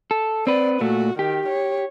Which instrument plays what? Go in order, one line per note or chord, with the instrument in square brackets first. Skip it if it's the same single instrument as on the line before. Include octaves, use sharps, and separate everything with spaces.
[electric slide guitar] A4
[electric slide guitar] C4 B4 [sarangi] D5
[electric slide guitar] A#2 A3 [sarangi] F#4
[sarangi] D#3 [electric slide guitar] G4
[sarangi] C#5